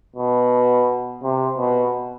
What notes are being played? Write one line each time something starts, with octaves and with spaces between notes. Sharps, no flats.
B2
C3
B2